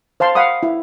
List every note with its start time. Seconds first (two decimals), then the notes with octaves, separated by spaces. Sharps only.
0.20 C5 F5 A5 C6
0.35 F5 F#5 B5 D#6
0.63 E4